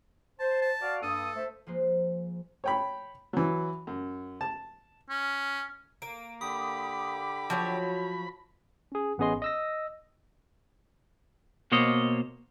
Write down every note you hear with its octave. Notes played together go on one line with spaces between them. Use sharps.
C5 A5
A5
F#4 D5 F5
G2 A#3 A4 D#6
A3 C5 E5
F3 G#3 A#3 B4 C5
C#5 G5 B5
E3 F#3
F#2
A5
C#4
A#3 D7
D3 G4 B5 D6 D#6
F3 F#3 F#4 C#5
C#4 G#4
A1 B3 C#4 G#4 D#5 C6
D#5 E6 A#6
B2 A#3 C5 C#5 D#5